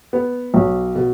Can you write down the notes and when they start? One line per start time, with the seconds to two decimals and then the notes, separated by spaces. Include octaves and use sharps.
0.13 B3
0.54 B1
0.95 B2